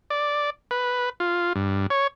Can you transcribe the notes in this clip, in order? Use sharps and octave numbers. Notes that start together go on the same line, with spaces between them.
D5
B4
F4
G2
C#5